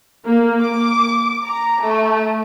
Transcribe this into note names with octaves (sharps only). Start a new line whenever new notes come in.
A#3
D6
A#5
A3